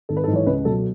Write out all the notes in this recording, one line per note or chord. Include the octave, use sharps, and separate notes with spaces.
G#1 A4
B4
A4
G#2
E3 C#5
C#2 B4
B2 F#3 A4